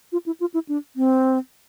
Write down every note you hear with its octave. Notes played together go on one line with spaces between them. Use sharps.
F4
E4
F4
E4
D4
C4